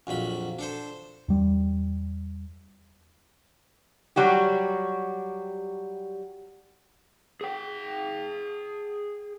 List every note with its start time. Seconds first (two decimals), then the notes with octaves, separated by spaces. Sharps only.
0.07 A#1 F2 F#3 B5
0.59 D4 A4 C5
1.28 E2 G3
4.16 F#3 G3 F#4 G4
7.41 G#4 G5